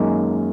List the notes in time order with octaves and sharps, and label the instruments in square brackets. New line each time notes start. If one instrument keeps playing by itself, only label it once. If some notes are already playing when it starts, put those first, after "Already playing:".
Already playing: [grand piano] F#2 D#3 G#3 A#3